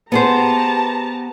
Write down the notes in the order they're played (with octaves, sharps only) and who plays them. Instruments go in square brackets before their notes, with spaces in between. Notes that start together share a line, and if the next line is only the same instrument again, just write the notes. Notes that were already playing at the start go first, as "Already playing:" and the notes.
[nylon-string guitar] B3 G#4 C5 [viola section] G4 A5 A#5